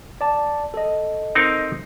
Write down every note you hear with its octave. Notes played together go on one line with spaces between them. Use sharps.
D5 A5
A4 D#5
C4 D#4 A#4